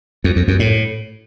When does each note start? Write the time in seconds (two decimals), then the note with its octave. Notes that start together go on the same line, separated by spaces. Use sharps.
0.24 F2
0.36 F2
0.48 F#2
0.59 A2